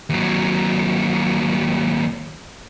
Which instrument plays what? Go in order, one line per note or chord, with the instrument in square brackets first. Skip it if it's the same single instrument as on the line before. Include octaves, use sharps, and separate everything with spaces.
[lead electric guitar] D#2 F#3